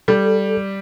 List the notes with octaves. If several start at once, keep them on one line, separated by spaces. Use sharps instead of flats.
G3 A4